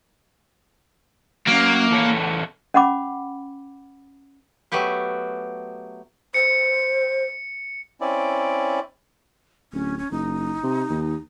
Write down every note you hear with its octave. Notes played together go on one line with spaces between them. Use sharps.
F#3 A#3 C#4
E2 A4 C#5
C#4 F#5 B5 D6
F#3 A3 B3 G4 B4
C5 C#7
C4 C#4 E4 D5
D1 C#4
C#4
F#1 D#4
C3
D#2